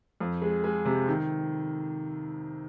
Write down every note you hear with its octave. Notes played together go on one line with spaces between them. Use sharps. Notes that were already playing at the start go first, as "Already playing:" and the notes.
F2
G#3
G#3
C3
D#3